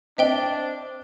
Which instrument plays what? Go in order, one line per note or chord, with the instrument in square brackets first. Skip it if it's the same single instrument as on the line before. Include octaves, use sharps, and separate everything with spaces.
[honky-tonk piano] C4 D#5 [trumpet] D4 [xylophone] E5 G5 G7